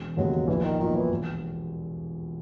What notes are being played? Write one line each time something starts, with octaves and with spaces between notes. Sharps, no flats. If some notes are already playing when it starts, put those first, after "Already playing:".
Already playing: E1
D#2 C#3 F#3 G#3 B3
A#1 E3
D#3
A#2 D#3 F#3 B3
E3
E1